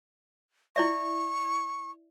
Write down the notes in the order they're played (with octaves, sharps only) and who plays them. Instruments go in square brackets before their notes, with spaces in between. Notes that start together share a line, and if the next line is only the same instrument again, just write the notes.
[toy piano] E4 D5 E5 [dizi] C#6